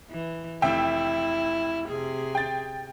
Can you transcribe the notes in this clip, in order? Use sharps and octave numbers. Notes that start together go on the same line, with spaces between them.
E3
F1 E4 E5 G5
C3 G#4
G5 A6